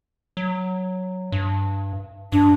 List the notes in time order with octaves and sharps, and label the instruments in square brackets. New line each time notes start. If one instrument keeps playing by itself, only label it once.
[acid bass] F#3
G2
[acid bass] G2 [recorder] D4